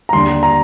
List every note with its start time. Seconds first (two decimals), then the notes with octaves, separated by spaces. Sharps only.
0.09 A#5
0.13 D#2 D3 G3 C6
0.43 A#5